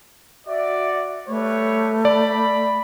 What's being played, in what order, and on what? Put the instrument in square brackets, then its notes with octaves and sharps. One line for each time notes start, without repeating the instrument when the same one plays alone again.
[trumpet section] F#4 D5 [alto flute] E5
[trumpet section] G3 B4 C#5 [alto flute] A3
[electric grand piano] D5 [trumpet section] B5